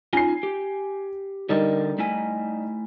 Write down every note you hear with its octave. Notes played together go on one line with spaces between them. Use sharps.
C#4 D#4 F4 G#5 C7
G4
D3 G3 D#4 A4 A#4
A3 E4 G#5